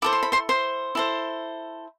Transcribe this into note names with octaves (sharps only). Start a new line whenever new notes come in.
E4 A4 C5 D6
C6
B5
C5 C6
C5 C6
E4 A4 C5